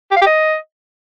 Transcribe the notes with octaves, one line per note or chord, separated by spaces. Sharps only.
G4
F5
G4
D#5